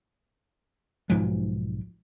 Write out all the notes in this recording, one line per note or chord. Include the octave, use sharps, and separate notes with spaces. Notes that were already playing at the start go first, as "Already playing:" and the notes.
B1 G#2 F3 G#3